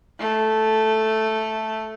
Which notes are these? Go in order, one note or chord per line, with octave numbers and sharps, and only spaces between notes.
A3